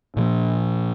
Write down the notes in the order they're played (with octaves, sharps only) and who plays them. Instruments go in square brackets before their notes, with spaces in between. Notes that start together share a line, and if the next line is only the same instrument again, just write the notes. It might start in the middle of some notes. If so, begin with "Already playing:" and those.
[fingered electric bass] A#2 F3 A#3